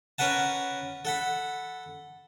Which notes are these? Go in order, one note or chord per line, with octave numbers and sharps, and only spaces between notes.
C#4 A#4 B4 F#5 A5
A4 F#5 B5